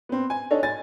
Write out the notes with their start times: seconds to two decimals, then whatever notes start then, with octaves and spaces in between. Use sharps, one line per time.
0.09 B3 C4
0.30 G#5
0.51 D4 D#4 A4 C#5
0.63 G#5 A6